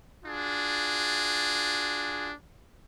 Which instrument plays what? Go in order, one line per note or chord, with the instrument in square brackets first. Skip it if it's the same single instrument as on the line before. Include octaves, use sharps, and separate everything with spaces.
[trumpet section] D4 F4 F#4 G#4